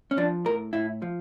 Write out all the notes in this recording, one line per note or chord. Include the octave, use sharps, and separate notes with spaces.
C#4
F3 D4
A2 A#4
A2 E4
F3